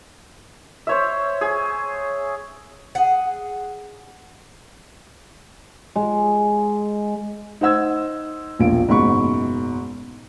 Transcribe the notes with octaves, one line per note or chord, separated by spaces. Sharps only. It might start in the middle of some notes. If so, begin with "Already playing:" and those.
C5 C#5 E5
G#4
G#4 F#5
G#3
D#4 C5 F#5 E6 G#6
E1 A#1 F4 D7
F#1 G#2 B2 B5 C#6